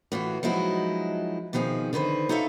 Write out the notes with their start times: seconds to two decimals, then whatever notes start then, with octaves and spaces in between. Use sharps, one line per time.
0.12 A2 E3 F4 F#4
0.43 F3 F#3 G#3 D#4 E4 F#4
1.53 B2 D#3 F3 C4 G#4
1.93 D3 D#3 B4 C5
2.29 D#4 F4 A4 C#5 E5 F5